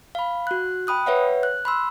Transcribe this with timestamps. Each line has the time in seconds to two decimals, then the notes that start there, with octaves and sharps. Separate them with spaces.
0.15 F5 B5
0.47 F#4 F#6
0.87 G5 B5 D#6 F#6
1.06 B4 C#5 E5 F#5
1.43 F#6
1.65 B5 C6 E6